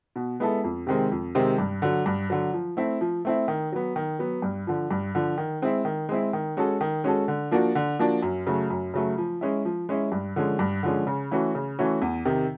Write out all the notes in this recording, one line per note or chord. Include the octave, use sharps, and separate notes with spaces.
B2
G#3 B3 E4 A4
F2
C3 D#3 G#3 C4
F2
C3 D#3 G#3 C4
G2
D3 F#3
G2
D3 F#3
F3
A3 C4 E4
F3
A3 C4 E4
D#3
F#3 B3
D#3
F#3 B3
G2
D3 F3
G2
D3 F3
D#3
G#3 C4 E4
D#3
G#3 C4 E4
D#3
G#3 C#4 F#4 A4
D#3
G#3 C#4 F#4 A4
D3
F3 A#3 D4 F#4
D3
F3 A#3 D4 F#4
F#2
C#3 F#3 A3
F#2
C#3 F#3 A3
F3
G#3 C#4 E4
F3
G#3 C#4 E4
G2
D3 F3 G#3 C#4
G2
D3 F3 G#3 C#4
C#3
E3 A3 C#4 F#4
C#3
E3 A3 C#4 F#4
E2
C3 D#3